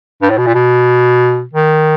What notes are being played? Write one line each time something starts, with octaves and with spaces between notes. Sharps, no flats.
G2
A2
B2
A#2
B2
D#3